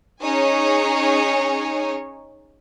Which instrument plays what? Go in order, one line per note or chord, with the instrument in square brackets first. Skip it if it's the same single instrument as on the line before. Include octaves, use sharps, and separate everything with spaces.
[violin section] C#4 D#4 G#4 C#5 G#5